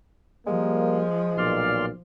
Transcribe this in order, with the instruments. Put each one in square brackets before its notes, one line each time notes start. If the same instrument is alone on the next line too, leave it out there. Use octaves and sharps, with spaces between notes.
[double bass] F3 [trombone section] G3 A#3 [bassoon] G#3
[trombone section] B1 A#2 [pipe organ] D5 C6 F6